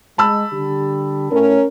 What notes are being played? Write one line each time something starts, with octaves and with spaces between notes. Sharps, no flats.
G#3 A5 B5 E6
D3 G3 G4
A2 C#4 A#4